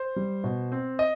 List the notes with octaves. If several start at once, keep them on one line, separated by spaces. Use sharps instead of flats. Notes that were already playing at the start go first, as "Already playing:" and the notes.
Already playing: C5
G3
B2
C4
D#5